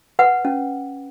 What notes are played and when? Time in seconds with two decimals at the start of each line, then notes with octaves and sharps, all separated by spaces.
0.19 B4 F#5
0.45 C#4